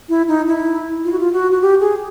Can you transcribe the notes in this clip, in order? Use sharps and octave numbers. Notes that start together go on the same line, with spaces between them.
E4
D#4
E4
F4
F#4
F4
F#4
F#4
G4
G#4